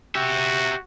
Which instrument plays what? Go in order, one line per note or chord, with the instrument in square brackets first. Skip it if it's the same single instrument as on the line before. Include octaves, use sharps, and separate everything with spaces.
[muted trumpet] F#4 [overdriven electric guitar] G4 E5